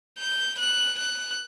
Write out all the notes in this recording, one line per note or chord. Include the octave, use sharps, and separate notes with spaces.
G6
F#6
F#6